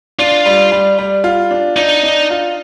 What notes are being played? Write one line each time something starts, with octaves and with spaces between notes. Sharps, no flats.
D4 F4
G3
G3
G3
F4
D4
D4 D#4
D4
F4